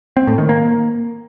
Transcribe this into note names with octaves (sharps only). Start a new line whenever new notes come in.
C4
A2
D#3
A#3